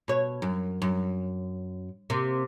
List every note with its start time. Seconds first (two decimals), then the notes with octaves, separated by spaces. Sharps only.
0.08 B2 C#5
0.42 F#2
0.82 F#2
2.10 C3 A#3